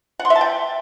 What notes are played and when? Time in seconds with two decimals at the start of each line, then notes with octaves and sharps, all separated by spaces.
0.20 F#5
0.25 C6
0.30 E5
0.36 A5
0.41 G5